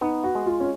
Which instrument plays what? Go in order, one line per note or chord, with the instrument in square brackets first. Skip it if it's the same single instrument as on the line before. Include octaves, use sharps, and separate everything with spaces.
[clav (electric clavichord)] B3 [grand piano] D#4
[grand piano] F#4
[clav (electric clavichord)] G#3
[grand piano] F4
C#4